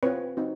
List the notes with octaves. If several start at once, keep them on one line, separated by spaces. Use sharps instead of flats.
C4 F4 B4 C#5
C4 D#4 F#4